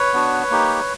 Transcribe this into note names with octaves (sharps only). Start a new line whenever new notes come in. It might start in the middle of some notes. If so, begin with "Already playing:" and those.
Already playing: B4 C#5
B3 D4 F#4
A#3 D#4 G4